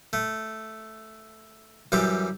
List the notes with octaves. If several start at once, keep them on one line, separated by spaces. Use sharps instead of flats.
A3
F#2 E3 G3 D6